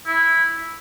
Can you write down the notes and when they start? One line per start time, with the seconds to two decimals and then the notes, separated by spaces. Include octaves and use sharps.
0.07 E4